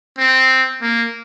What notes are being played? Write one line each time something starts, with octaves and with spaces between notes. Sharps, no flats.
C4
A#3